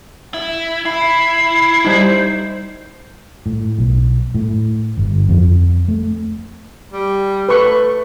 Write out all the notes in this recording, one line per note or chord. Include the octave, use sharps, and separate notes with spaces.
E4
E4 B5 C7
G3 D#4 C5
A2
B1
A2
G1
F2
A3
G3
A3 B4 C#6